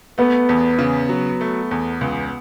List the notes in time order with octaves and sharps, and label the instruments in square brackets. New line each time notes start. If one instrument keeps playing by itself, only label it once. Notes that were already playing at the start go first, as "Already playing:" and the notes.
[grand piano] A3 [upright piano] B3
[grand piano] E2
C#3
F#3
A3
E2
C#2